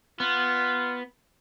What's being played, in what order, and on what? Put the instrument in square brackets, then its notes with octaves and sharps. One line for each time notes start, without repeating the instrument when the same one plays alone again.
[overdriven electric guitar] B3 [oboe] F4